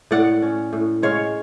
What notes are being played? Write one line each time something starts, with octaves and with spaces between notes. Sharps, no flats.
A2 D5 F#5
C#4
A2
G#3 C#5 F5